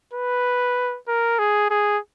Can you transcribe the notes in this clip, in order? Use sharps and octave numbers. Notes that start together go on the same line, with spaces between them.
B4
A#4
G#4
G#4